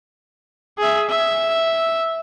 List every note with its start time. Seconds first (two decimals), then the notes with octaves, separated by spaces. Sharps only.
0.78 G#4 E5
1.10 E5